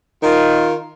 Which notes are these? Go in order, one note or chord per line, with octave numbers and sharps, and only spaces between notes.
D#3 F4